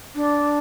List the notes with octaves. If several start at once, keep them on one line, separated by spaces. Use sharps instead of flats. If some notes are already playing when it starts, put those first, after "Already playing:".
D4